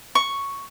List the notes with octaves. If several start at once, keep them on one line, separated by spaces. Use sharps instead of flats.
C#6